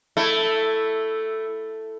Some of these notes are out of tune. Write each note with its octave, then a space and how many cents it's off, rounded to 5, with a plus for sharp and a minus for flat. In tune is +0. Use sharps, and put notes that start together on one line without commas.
A3 +5 E4 +0